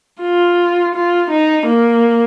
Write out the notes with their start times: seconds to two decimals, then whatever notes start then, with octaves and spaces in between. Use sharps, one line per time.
0.22 F4
0.95 F4
1.30 D#4
1.66 A#3